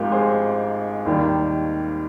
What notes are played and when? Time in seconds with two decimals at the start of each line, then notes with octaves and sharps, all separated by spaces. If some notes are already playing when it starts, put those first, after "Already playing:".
Already playing: G#1 G#2 F3 F4 G4 A#4
0.12 G#4 C5
1.05 D#2 D#3 G3